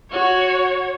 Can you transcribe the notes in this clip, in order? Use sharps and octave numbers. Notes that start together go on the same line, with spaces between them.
F#4 C#5